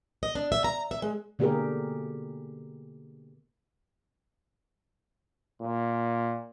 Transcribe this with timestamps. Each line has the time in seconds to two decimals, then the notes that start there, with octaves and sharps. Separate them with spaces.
0.23 D#5
0.35 D4
0.52 E5
0.64 A#5
0.91 E5
1.02 G#3
1.39 B2 D3 A#3 G4 G#4 A#4
5.62 A#2